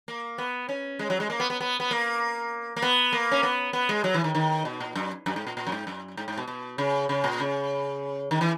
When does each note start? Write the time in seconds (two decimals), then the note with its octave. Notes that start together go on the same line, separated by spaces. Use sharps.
0.08 A#3
0.38 B3
0.69 C#4
0.99 G#3
1.10 F#3
1.20 G#3
1.30 A#3
1.40 B3
1.50 B3
1.61 B3
1.80 B3
1.91 A#3
2.76 A#3
2.82 B3
3.13 A#3
3.31 C#4
3.43 B3
3.73 B3
3.89 G#3
4.04 F#3
4.14 E3
4.24 D#3
4.35 D#3
4.65 B2
4.80 A#2
4.95 F#2
5.26 F#2
5.36 G#2
5.47 A#2
5.57 A#2
5.67 F#2
5.72 G#2
5.87 F#2
6.17 G#2
6.28 G#2
6.38 B2
6.48 B2
6.78 C#3
7.09 C#3
7.24 A#2
7.40 C#3
8.31 D#3
8.41 E3